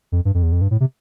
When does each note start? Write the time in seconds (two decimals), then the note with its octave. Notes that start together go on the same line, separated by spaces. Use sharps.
0.12 F2
0.25 G2
0.34 F2
0.43 E2
0.52 F2
0.61 G2
0.71 A2
0.80 C3